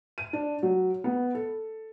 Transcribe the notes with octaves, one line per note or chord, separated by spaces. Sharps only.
D#7
D4
F#3
B3
A4